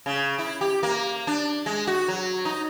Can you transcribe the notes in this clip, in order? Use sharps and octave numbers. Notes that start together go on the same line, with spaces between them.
C#3
E4
G4
A#3
D4
G#3
F#4
F#3
D#4